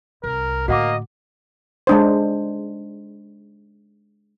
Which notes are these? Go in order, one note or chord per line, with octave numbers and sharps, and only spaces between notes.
C2 A#4
A2 D3 A#3 F#4 D#5 F#5 D6
G#3 D4 C5